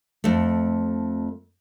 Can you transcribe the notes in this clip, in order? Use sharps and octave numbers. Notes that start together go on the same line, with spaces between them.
F2 A3